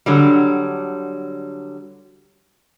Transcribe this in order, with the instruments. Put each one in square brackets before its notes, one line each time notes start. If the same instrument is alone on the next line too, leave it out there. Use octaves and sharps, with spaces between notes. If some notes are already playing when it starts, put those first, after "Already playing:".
[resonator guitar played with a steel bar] D3 F#3 G3